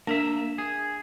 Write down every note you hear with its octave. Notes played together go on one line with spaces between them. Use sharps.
A#3 D4 A#4 E5
G#4